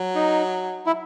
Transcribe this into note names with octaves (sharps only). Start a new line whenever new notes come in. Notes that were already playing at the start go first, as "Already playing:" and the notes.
Already playing: F#3
D#4
E4